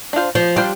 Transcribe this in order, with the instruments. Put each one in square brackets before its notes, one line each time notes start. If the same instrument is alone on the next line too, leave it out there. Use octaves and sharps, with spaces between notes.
[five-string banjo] D4 F4 C5
[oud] F3
[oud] G3 [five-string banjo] D4 F4 C5